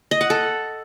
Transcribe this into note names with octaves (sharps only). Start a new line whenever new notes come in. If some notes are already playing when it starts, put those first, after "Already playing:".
D#5
F#5
A4